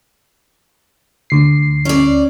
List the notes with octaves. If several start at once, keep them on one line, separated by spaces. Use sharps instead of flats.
D2 C7
C#4 D5